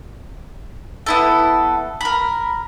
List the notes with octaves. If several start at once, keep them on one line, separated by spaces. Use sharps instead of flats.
B3 E4 A4
A#4 B5